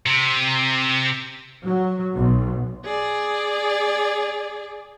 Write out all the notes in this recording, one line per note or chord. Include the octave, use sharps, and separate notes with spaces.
C3
F#3
B1
G#4 D5